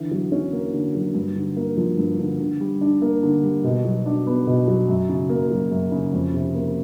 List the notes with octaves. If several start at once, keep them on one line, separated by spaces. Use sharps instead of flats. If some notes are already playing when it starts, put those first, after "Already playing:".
Already playing: D3 E3
F#3
C#4
A#3
D3
F#3
G2
D3
A#3
F3
G2
D3
D3
G3
D4
A#3
D3
G3
B2
F#3
D4
B3
B2
F#3
F#2
C#3
A#3
F#3
F#2
C#3
F2
C3
A#3